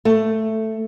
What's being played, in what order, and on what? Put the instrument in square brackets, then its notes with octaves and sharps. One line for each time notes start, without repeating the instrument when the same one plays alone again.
[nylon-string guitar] A3